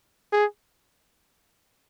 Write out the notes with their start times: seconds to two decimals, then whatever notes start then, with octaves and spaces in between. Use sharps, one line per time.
0.33 G#4